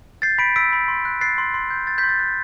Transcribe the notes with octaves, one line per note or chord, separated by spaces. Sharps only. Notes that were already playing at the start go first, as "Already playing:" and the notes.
G6 A6 C7
B5 B6 D7
E6 B6 D7
B5
C6
F#6
F#6 A6 C7
C6
C6
G6
G6 A6
G6 B6
C6
A6
F#6 G6